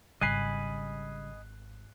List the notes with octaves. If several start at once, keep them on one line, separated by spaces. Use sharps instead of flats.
G#1 C#3 G3 D#5 G#5 B5 F#6 C7